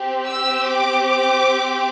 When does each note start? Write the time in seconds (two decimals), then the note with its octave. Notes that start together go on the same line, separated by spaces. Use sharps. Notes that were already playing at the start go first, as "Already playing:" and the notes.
Already playing: C4 G4
0.27 E6
0.68 D6
1.07 D6